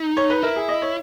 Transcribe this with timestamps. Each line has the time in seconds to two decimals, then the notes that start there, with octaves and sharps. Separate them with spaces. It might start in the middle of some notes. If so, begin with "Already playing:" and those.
Already playing: D#4
0.17 C#5
0.30 B4
0.43 E4 A#4
0.56 G#4
0.69 D#5
0.82 C#5